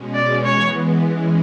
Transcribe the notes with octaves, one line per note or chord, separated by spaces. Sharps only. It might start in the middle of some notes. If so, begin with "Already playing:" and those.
Already playing: B2 G#3 C#4
D5
E3 G#3 B3 C#5
E3 G#3 C#4